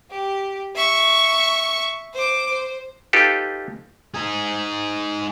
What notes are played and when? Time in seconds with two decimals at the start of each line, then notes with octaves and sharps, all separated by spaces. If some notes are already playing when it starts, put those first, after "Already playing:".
0.11 G4
0.76 E5 C#6
2.14 C5 D6
2.50 C5
3.13 D#4 F4 G4 A4 B4
4.14 D#4 G#4